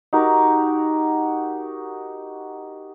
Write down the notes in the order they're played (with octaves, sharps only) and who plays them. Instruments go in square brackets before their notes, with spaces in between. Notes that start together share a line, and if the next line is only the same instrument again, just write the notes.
[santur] D#4 F#4 G4 A#4